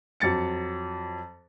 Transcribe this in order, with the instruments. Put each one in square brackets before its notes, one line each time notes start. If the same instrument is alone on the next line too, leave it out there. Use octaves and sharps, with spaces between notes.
[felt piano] F2 F#3 A6 C#7